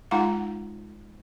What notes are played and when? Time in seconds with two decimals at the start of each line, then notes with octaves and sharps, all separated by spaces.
0.11 G#3 D#4 F4 F5 F#5 A#5